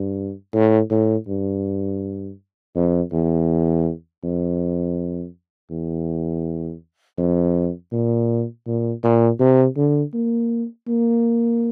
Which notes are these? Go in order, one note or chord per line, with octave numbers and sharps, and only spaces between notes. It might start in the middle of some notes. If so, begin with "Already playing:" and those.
Already playing: G2
A2
A2
G2
F2
E2
F2
E2
F2
A#2
A#2
A#2
C3
D3
A#3
A#3